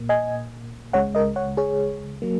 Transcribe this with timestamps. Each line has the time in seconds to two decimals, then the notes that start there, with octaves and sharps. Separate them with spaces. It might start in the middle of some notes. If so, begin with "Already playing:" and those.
Already playing: A#2 A#3
0.09 D#5 G#5
0.93 C#2 C#3 G#3 C#5 F#5
1.15 A#4 D#5
1.36 C#5 F#5
1.57 G#4 C#5
2.22 F#3 A#3